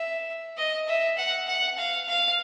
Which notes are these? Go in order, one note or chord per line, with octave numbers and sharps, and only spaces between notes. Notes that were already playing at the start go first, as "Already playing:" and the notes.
Already playing: E5
D#5
E5
F#5
F#5
F5
F5